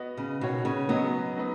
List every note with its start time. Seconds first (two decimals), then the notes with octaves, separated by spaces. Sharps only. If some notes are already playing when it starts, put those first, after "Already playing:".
Already playing: B3 F#4 D#5
0.17 C#3
0.41 B2 D#3 B3 F#4 C#5
0.65 C#3
0.89 F#3 B3 C#4 F#4 D#5
1.36 F#3 D#4 B4 D#5